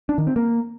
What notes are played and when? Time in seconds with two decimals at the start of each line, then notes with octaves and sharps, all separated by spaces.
0.09 D4
0.18 D#3
0.27 C4
0.36 A#3